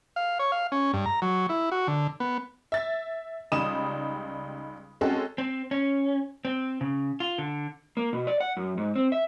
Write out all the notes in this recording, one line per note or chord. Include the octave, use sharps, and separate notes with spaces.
F5
C#5
F5
C#4
G2
A#5
F#3
E4
F#4
D3
B3
E5 A6
C#2 G3 D#4 D#6 E7
G#3 C4 C#4 F#4 A4
C4
C#4
C4
C#3
F4
D3
A#3
B2
D5
F#5
F#2
G#2
C4
E5